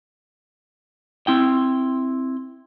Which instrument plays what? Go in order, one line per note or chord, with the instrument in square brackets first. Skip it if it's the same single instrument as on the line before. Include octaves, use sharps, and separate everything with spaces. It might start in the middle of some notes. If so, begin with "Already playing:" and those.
[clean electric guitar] C4 E4 G5